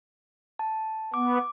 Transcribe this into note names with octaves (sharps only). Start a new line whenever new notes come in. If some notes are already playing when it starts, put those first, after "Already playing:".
A5
B3 D6